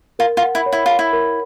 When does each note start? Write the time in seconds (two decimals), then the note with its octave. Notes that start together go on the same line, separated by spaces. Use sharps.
0.19 F4 A#4
0.37 F4
0.43 F#5
0.55 E4
0.66 C#5
0.73 E4
0.86 F4 B5
0.99 E4
1.13 A#4